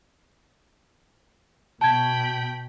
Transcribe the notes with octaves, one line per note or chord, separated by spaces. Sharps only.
B2 G5 A5 B5 G#6